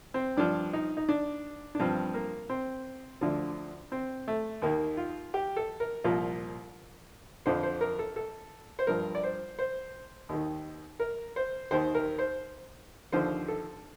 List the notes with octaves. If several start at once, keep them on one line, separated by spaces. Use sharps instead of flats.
C4
G2 F3 D4
D#4
D#4
D4
D4
G2 F3 C4
A#3
C4
D2 D3 F3
C4
A3
D#2 D#3 A#3
F4
G4
A4
A#4
C2 A#2 F3
F2 D3 F3 C5
C5
A#4
A4
A4
C5
G2 F3 A#4
D5
C5
C5
D#2 D#3
A#4
C5
D#2 D#3 C5
A#4
C5
D#2 D3 F3 C5
A4